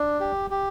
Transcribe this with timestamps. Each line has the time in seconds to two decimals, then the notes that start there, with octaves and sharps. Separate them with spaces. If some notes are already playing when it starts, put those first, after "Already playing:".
Already playing: D4
0.20 G4
0.50 G4